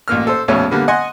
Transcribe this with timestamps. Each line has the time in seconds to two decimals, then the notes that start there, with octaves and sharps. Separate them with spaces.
0.08 A1 A#2 A#3 F6
0.27 A4 C5
0.48 A#1 F2 B2 A3 C#4
0.71 D3 G3 A#3 B3
0.88 D#5 F#5 G#5 C6 D#6